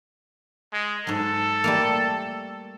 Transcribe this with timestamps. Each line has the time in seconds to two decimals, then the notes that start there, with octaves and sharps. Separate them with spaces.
0.73 G#3
1.07 G#2 F#3 A4
1.64 G3 A3 A#3